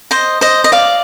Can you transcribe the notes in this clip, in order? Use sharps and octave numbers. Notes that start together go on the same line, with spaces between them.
C5 D#5
C5 D#5
D#5
D5 F5